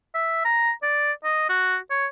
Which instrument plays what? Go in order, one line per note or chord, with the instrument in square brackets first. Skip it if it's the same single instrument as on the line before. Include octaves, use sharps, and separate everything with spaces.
[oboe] E5
A#5
D5
D#5
F#4
C#5